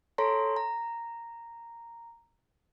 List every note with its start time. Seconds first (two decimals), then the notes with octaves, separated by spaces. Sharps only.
0.18 A4 C#5 A#5 C6
0.56 A#5